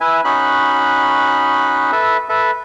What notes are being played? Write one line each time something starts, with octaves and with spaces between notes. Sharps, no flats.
E4 B4 E5 G#5
C#4 D#4 F#4 B5 F#6
A4 B4 E5
A4 B4 E5